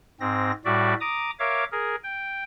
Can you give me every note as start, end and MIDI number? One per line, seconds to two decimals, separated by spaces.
0.20 0.52 44
0.20 0.52 60
0.20 0.52 94
0.65 0.94 45
0.65 0.94 55
0.65 0.94 66
0.65 0.94 74
0.65 0.94 76
1.01 1.31 82
1.01 1.31 86
1.01 1.31 87
1.40 1.64 70
1.40 1.64 73
1.40 1.64 76
1.40 1.64 77
1.40 1.64 86
1.72 1.96 68
1.72 1.96 70
2.04 2.44 79